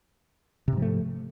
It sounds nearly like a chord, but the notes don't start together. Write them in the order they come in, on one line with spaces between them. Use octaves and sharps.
C3 G#2 F3 A3